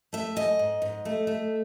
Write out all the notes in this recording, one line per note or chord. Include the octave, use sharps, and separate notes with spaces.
A3 E5
G#2 D#5
G#2
G#2
A3
A3